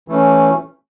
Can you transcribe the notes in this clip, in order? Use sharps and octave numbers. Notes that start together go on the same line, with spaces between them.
E3 A3 C#4